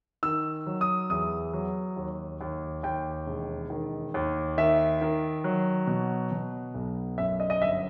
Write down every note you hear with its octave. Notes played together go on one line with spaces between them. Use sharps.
D#3 E6
F#3
D#6
E2 D#6
F#3
D#2
D#2
D#2 G5
E1
D#3
D#2
D#3 E5
D#3
F#3
B2
B2
B1
F#2 E5
D#5
D#5
G1 E5